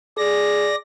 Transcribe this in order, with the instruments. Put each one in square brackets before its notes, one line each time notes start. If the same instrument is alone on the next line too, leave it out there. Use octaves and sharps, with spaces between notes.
[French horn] G#4 [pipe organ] D5 A#6